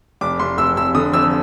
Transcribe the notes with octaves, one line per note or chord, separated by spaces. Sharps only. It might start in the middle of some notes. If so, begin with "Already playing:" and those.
F1 D6
F1 C6
F1 E6
F1 E6
D3 D#6
F2 E6